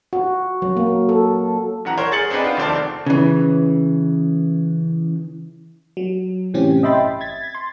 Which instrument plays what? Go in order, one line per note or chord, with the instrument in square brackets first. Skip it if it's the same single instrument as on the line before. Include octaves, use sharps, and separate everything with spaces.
[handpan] F#4
F#3
A#3
A4
[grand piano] D#1 E3 F#5 A#5
A#4 C5 C#5
G#4 A6 C#7 F#7
C4 D4 D#4 G#4 B4
B3 C4 F4
F1 D#3 A3 C5 D5 A5
[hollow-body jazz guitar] C#3 E3
[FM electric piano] F#3
A2 C3 E3 C4 C#4 G4
D#5 E5 G5 B5 C6 A6
G1
G#6 A6 B6
C6